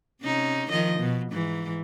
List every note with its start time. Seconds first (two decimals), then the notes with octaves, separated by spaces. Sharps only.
0.22 C3 C#4 D#4
0.70 D#3 F3 D#5
1.00 B2
1.32 G#2 E3